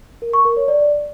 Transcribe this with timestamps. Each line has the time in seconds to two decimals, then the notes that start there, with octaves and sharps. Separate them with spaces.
0.22 A#4
0.33 C#6
0.45 A#4
0.57 C#5
0.68 D5